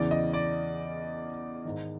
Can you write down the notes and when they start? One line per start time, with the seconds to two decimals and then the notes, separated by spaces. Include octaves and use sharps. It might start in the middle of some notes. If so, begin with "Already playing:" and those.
Already playing: E2 C#3 E3 D5
0.11 D#5
0.34 D5
1.65 G#2 D#3